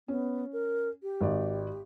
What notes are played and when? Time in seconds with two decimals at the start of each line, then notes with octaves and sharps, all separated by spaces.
0.08 B3 C#4
0.53 A#4
1.03 G4
1.21 G#1 D5